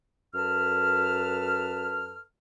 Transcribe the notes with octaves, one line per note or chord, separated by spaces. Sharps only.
F#2 A4 B4 A5 F6